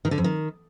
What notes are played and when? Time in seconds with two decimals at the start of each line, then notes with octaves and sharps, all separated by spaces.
0.05 D#3
0.11 D3
0.18 F2
0.24 D#3